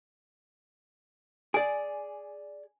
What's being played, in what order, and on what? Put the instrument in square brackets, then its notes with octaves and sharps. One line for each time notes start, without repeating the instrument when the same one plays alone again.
[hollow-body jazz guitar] G#4 D5 [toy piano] G#5